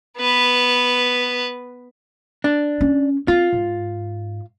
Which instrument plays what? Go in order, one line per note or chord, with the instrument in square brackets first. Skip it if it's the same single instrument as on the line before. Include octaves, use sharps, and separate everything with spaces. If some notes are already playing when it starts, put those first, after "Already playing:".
[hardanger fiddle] B3 B4
[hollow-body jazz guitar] D4
[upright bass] C#4
[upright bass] C4 [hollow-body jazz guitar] F4
[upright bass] G#2